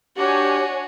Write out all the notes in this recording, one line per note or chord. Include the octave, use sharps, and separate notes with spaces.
D4 F#4 G4 C#5 G#5